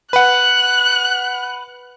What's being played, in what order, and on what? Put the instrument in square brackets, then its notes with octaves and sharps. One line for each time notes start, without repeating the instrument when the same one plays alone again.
[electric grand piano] B4 F#5 [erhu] F#6